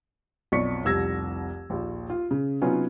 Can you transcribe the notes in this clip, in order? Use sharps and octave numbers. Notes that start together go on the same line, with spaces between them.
B1 F2 D5 C#6 B6 C#7
F1 C2 E6 G#6 A#6
A#1 D#2
F4
C#3
C3 F#3 B3 C#4 D#4 F4